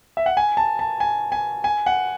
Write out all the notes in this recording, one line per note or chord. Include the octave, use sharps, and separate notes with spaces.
E5
F#5
G#5
A5
A5
G#5
G#5
G#5
F#5